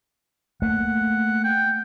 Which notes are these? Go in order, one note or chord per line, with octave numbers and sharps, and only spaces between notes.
A3 A#3 F#5
G5